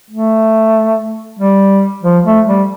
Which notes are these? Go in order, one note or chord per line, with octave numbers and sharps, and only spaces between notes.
A3
G3
F3
A3
G3